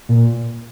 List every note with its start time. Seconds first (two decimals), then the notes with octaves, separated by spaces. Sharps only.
0.09 A#2